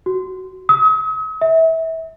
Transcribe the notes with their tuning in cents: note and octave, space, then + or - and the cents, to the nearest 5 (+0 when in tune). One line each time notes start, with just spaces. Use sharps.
F#4 +15
D#6 +45
E5 -25